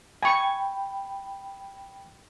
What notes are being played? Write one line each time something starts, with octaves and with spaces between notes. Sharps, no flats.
G5 G#5 B5 C#6